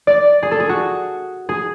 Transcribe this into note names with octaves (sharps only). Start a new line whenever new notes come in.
D5
G#4
A4
G#4
F#4
G#4